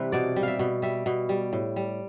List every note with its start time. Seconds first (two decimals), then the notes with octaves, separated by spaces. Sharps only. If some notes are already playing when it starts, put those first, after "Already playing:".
Already playing: C3 E3 G3 B4
0.12 B2 D5
0.36 G3
0.43 E5 F5
0.59 B2
0.82 G3 E5
1.06 B2
1.29 G3
1.53 A2
1.76 G3